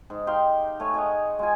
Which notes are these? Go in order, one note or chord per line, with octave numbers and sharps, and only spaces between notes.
G#2
D#4 G4 F5 C6
A3 C#5 G#5
G#4 D#5 F#5
G#3 F4 G#5